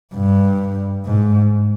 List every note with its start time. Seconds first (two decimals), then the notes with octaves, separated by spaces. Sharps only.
0.15 G2
1.05 G#2